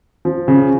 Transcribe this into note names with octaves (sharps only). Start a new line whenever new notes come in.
F3
C#3